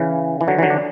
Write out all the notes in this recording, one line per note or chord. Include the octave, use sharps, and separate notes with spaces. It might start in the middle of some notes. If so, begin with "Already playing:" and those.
Already playing: C#3 E3
E3
D3 F#3
E3
D3 F#3
D4